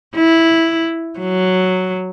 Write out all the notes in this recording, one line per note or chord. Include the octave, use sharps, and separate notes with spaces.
E4
F#3